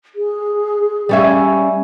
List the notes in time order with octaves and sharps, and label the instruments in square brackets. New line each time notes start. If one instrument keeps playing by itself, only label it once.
[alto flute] G#4
[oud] G3 C#4 E5